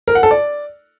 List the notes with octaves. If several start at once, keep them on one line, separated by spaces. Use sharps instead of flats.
A#4
F#5
A4
D5